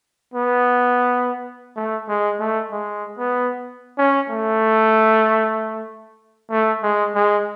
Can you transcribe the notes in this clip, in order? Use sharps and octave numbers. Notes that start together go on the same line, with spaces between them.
B3
A3
G#3
A3
G#3
B3
C#4
A3
A3
G#3
G#3